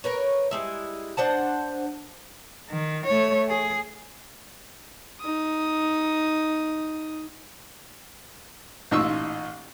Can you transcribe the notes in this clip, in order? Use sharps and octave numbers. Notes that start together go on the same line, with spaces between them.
A#4 B4 C#5
G3 G#3 E4
D4 C5 F#5 A5
D#3
A3 C#5
G#4
D#4 D#6
A1 A#2 D#4 F4 C#6 E6